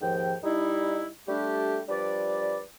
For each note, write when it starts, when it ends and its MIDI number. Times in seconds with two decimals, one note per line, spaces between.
0.01 0.35 39
0.01 0.35 44
0.01 0.35 53
0.01 0.35 79
0.44 1.06 55
0.44 1.06 63
0.44 1.06 64
1.27 1.80 55
1.27 1.80 57
1.27 1.80 62
1.27 1.80 67
1.89 2.60 53
1.89 2.60 55
1.89 2.60 62
1.89 2.60 71
1.89 2.60 74